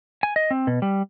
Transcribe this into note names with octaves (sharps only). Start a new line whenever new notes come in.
G#5
D#5
C4
B2
G3